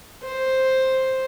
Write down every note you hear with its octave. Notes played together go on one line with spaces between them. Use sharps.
C5